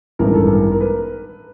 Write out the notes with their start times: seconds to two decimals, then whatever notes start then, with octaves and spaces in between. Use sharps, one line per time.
0.19 A1 G2 D#3 G#3 B3 A#4
0.34 A4
0.51 A#4
0.72 A#4
0.81 B4